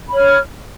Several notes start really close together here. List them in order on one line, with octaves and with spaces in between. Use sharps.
B5 C#5 F6